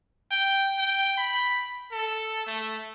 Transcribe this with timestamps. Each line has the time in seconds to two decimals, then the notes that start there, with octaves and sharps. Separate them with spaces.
0.31 G5
0.78 G5
1.18 B5
1.92 A4
2.46 A3